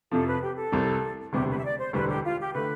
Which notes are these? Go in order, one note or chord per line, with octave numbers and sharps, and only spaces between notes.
F2 C3 F3 A4
B4
G4
A4
C2 C3 G3
E1 D2 C3 G3 B3 G4
B4
E5
D5
C5
E1 D2 D3 G3 B4
G4
F4
G4
D3 A3 B4